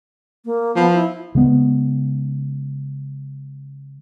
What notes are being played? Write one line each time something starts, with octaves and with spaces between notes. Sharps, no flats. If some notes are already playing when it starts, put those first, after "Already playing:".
A#3
F3 B3
E4
C#3 G#3 B3